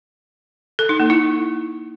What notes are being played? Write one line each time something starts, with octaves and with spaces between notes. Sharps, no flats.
A4
D#4
A#3
E4